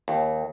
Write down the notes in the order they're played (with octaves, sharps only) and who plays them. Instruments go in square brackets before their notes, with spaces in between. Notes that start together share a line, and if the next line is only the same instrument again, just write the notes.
[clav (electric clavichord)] D#2